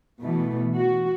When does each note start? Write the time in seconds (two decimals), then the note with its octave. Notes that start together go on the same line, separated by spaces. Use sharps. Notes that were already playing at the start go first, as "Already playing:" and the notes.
0.22 B2 E3 A3
0.74 F#4